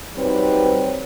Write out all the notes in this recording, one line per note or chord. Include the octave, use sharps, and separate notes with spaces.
F#3 G3 C4 D#4 B4 C#5